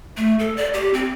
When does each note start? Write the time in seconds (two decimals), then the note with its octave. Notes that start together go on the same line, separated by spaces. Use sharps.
0.17 A3
0.39 A4
0.57 D5
0.74 G4
0.94 C4